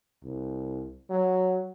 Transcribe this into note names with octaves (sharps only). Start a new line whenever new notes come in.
C2
F#3